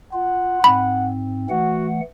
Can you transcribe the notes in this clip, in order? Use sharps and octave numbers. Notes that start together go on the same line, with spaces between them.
F4 F#5
G#2 C4 B5
E3 A3 F#4 F#5